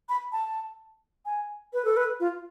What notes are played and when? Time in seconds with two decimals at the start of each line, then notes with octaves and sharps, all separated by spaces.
0.09 B5
0.32 A5
1.26 G#5
1.73 B4
1.85 A4
1.97 B4
2.20 F4